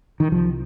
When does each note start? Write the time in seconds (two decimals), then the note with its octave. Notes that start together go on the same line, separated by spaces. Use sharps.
0.20 D#3
0.32 C2 F3